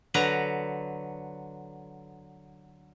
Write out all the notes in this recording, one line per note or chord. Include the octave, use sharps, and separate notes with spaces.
D3 F#3 B4 A#5